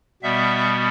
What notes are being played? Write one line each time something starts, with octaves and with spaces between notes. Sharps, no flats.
B2 G3 B3 E5